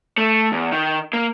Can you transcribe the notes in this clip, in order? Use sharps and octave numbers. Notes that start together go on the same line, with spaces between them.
A3
E2
D#3
A#3